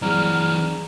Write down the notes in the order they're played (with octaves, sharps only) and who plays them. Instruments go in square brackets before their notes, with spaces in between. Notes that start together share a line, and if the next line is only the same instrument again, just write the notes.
[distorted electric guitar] E3 C4 [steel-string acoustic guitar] F#3 D5 [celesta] G#4 A#5 [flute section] F6